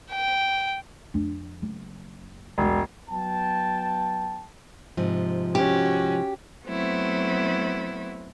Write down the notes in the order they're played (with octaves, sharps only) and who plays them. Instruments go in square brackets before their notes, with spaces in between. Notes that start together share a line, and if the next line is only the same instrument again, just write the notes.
[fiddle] G5
[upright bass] F2 D4
F#1
[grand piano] E1 [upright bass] B1 G#3
[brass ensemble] F#3 B3 G5 A5
[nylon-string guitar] G#2 C3 F3
[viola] C#4 F#4 [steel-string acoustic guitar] G4
[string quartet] F#3 A3 B3 C4 E4